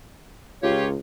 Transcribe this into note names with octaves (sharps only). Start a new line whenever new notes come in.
C#2 F4 G4 C#5